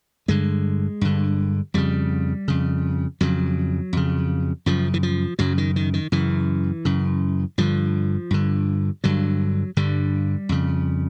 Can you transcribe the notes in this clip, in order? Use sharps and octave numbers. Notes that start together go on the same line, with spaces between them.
G2 D3 G#3
G2 D3
F2 C#3 G3
F2 C#3
F2 C#3 F#3
F2 C#3
F#2 C#3 F3
E3
F3
F#2 C#3 F#3
D#3
D#3
D#3
F#2 C#3 E3
F#2 C#3
G2 D3 F3
G2 D3
G2 D3 F#3
G2 D3 G3
F2 C#3